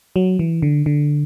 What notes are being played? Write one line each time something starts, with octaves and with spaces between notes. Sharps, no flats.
F#3
E3
D3
D3